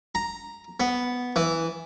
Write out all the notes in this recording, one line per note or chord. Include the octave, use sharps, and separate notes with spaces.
A#5
B3
E3